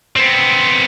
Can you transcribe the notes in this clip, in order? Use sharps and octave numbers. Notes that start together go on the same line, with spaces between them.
B3 C4